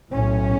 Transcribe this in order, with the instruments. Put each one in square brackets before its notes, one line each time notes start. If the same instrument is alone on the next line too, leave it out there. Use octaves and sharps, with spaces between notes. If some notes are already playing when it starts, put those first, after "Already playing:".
[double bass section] B1 A2 C#4